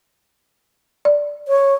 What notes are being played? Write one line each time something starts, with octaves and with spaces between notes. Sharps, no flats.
D5
C#5